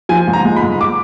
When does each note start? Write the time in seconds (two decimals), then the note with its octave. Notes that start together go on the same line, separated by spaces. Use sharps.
0.09 F3 G#5
0.27 G#2
0.33 A#5
0.45 G#3
0.56 B5
0.63 G#2
0.81 D6